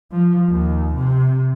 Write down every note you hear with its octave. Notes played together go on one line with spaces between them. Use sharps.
F3
D#2
C3